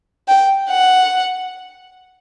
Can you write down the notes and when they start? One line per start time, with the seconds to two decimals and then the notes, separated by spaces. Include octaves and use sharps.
0.28 G5
0.70 F#5